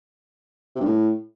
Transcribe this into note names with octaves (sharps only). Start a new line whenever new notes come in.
C3
G2
A2